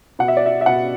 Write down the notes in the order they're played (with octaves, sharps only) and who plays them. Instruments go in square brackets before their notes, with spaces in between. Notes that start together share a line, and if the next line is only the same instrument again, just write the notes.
[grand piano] B2 F#5
E5
D5
E5
E5
B2 F#5